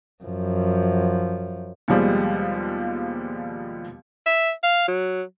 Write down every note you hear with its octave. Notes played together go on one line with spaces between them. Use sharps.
F#2 F3
D#2 B2 F3 G3 G#3
E5
F5
F#3